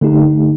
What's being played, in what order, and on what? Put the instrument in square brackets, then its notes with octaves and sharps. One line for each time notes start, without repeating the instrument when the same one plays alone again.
[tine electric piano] D3 A3 D#4 G4